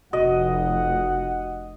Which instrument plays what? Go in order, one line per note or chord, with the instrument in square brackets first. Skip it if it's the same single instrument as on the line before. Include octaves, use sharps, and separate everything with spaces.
[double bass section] F1 [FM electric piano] F#4 [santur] D#5 [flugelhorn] F#5